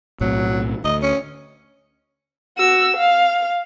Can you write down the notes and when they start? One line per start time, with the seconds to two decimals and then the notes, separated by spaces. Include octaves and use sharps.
0.21 B1 A2 F#3 C4
0.84 D2 D#5
1.02 C#4
2.58 F#4 E6
2.96 F5